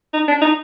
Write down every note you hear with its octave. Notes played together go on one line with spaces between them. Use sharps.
D#4
D4
D#4